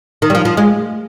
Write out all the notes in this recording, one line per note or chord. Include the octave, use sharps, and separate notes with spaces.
D#3
G3
F3
F3
G#3